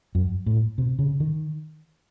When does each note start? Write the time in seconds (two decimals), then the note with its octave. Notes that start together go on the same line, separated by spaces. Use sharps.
0.15 F#2
0.46 A2
0.78 C3
0.99 C#3
1.20 D#3